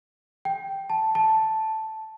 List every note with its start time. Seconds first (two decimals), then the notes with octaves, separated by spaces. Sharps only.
0.45 G5
0.90 A5
1.15 A5